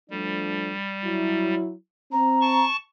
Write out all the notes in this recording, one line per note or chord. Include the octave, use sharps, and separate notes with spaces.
F3 G3 A3 D4
F#3 E4
C4 A#5
A5 C#6